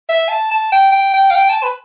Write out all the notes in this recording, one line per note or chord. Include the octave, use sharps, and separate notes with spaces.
E5
A5
A5
G5
G5
G5
F5
G5
A5
B4